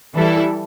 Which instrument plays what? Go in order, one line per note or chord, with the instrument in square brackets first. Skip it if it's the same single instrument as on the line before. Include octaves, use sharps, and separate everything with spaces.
[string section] E3 G3 E4 A4